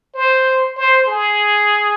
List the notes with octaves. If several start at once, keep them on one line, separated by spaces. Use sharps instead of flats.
C5
C5
G#4